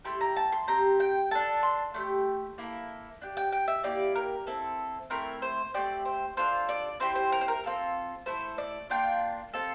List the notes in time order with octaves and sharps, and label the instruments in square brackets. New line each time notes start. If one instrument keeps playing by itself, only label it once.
[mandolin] A3 E4 G4 C6
A#5
A5
C6
C4 G4 A#5
G5
D4 A4 A5
C6
A3 D4 G4
A#3 E4 A4
D4 G4
G5
G5
E5
A#3 E4 G4 D5
A#4
C4 E4 A4
A3 C4 E4 A#4
C5
A3 C4 G4 D5
C5
D4 F4 A4 C5
D5
C4 E4 G4 C5
C5
A#4
C5
A#4
C4 F4 A4
A3 E4 A4 C5
D5
A#3 D4 F4 G5
C4 F4 A4